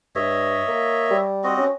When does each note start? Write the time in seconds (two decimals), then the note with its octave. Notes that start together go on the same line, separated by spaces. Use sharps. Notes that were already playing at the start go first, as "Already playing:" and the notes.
0.15 G2 C#5 D#5 E5
0.68 A#3
1.11 G3
1.44 C4 F#4 D#5
1.57 C#4